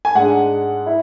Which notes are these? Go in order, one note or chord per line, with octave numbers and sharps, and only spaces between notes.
G#5
G#2 G#3 D4 F#5
E4